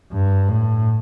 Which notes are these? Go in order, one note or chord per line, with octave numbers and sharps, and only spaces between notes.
G2
A2